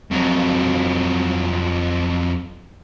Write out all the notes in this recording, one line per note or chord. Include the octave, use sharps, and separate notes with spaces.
F2 F#3